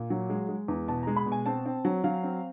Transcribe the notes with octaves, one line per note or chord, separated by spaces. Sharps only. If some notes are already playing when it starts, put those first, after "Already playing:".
Already playing: A#2
F#3
G#3
G#3
E2
B2 A5
G#3 A#5
B5
B2
G#5
C4 A5
C4
F#3
F#3 F5
C4